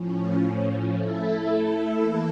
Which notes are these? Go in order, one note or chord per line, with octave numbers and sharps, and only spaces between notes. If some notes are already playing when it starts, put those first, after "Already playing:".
Already playing: A2 F3 C#4
A3 E4 A4
E3 A#3 E4 A4